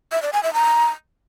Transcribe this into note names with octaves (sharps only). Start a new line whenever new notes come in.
E5
D5
G#5
E5
A#5